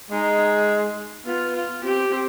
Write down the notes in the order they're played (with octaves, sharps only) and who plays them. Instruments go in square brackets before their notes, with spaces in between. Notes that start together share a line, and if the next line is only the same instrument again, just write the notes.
[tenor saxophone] G#3 [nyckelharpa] D#4
[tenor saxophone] B3 [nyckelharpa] F4
[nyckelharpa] F4
[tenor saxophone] C4 [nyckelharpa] G4
[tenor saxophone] C4